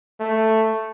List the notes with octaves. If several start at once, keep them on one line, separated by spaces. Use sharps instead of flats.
A3